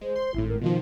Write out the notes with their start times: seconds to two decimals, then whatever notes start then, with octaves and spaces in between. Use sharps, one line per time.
0.01 G#3 C5
0.16 C6
0.34 G#1 A2 E4
0.48 A#4
0.61 B2 D#3 F3 F4